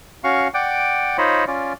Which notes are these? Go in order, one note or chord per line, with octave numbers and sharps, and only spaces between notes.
C#4 F#4 F5 C#6
D5 F#5 G5 D6
D#4 F4 C5 C#5 D#5 B5
C#4 F4 D5